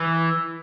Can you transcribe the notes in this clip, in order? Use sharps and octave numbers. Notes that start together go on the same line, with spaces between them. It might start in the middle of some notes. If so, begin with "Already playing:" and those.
Already playing: E3